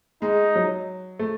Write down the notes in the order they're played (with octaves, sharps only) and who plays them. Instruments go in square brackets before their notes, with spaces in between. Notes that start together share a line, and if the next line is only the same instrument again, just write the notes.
[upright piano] G#3 [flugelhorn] D#4
[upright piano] F#3
A3